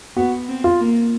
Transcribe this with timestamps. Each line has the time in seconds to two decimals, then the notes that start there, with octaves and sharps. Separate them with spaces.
0.17 B3 F#4
0.49 C4
0.64 F4
0.80 A#3